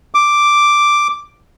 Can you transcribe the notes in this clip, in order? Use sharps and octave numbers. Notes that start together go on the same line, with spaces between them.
D6